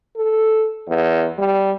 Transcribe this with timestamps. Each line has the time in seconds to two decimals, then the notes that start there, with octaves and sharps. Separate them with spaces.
0.16 A4
0.88 E2
1.38 G3